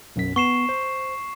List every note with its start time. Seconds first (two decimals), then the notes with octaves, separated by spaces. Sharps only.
0.16 B1 F#2 B6
0.36 B3 C#6 C7 E7
0.69 C5